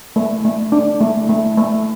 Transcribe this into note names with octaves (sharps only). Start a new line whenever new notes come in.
A3
A3
D4
A3
A3
A3